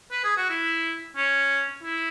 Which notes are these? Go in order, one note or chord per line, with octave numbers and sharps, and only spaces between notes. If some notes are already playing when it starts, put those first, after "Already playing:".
B4
G#4
F#4
E4
C#4
E4